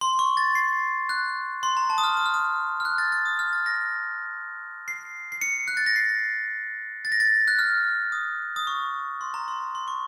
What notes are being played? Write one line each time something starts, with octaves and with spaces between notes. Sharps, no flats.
C6
C#6
A6
C7
F#6
C6
A#5
A5
D#6
F6
D#6
F6
D#6
F6
F#6
A6
A6
D#6
F6
A6
A#6
C7
C7
C#7
F#6
A6
A#6
C7
A6
A#6
A6
F#6
F6
D#6
D#6
C#6
C6
A#5
C6
C6
C#6